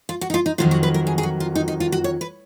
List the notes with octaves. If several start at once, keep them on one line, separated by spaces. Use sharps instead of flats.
F4
F#4
D#4
F4
D#4
F2 D#3 F#3 F4
F#4
B4
A#4
G#4
G#4
F#4
F4
D#4
D#4
F4
F#4
C#5
B4